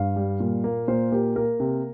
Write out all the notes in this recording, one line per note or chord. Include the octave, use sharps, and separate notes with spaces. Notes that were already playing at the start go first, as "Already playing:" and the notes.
Already playing: G2 F5
G3
A#2
A#3
A#2 C5
A#3 G4
A#3 A#4
C3